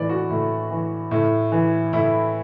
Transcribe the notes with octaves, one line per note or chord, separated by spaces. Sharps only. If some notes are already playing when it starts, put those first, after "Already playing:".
Already playing: A2 E3 D5
F#4
A2
E3
A2
E3
A2 E4